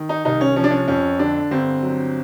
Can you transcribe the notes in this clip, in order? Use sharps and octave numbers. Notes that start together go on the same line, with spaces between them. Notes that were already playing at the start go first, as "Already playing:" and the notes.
Already playing: D#3
D#4
C2 D#4
C#4
F3 C#4
D4
C#4
F2 C#4
D3 D4
G1 C4
F#3